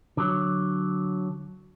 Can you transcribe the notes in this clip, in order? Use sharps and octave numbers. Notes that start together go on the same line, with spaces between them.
D3 F#3